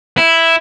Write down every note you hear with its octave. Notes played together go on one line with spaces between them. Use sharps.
E4